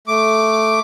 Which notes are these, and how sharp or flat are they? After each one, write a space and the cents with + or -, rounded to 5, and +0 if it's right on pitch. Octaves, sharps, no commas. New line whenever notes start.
A3 +0 D6 +0